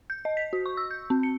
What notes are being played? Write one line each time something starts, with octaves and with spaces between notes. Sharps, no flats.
G6
D#5
B6
F#4
C#6
E6
G6
C4
C#7